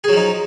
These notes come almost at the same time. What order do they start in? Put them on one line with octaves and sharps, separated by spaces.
G#4 F#3 F3 D#4